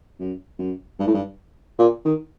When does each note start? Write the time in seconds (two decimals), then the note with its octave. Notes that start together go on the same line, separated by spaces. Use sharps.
0.20 F#2
0.59 F#2
0.99 G2
1.07 A2
1.14 G2
1.79 A#2
2.05 D#3